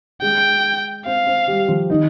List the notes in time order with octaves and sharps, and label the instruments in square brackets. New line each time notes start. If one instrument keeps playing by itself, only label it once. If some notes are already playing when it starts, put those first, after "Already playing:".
[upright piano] G#3 G#4 [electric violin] G5
[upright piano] C4 C5 [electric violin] F5
[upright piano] C4 C5
G3 G4
F3 F4
D#3 D#4